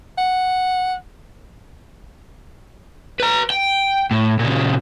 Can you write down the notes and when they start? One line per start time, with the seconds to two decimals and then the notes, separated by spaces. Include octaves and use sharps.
0.18 F#5
3.20 B4 A#5
3.50 G5
4.11 A2
4.39 A#2 C#3